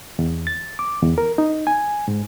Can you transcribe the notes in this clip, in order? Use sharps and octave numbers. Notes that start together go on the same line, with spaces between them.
E2
A6
D6
E2
A#4
D#4
G#5
G#2